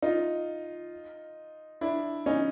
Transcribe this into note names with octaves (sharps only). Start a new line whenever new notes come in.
D#4 F4
D4 E4
C#4 D#4